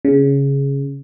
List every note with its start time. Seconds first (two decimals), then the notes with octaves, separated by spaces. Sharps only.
0.05 C#3